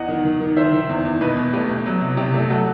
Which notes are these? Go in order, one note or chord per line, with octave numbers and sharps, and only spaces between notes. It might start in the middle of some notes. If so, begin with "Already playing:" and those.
Already playing: E2 D#5 F#5
D#3
D#3
D#3
D#3 C5 E5
D#3
E2
E2
B2 B4 D#5
B2
A3 G4 B4
B2
F#3
C3
C3 G4
A3
F#3 F#4 A4